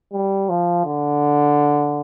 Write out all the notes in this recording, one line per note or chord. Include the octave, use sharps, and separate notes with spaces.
G3
F3
D3